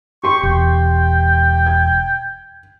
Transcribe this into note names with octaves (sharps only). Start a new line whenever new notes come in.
G4 C6 C#6
E1 G5
G#6